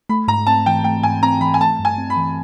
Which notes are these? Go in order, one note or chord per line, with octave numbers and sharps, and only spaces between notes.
A3 B5
G#2 A#5
C4 A5
E3 G5
A3 G5
G#2 G#5
C4 A#5
E3 B5
G#5
A3 A5
G2
G#5
C4
B5
E3